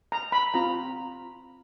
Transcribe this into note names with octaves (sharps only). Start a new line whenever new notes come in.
A#5
B5
C4 F4 A#5